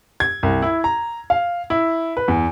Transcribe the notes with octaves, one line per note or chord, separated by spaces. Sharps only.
G#6
C2
E4
A#5
F5
E4
B4
E2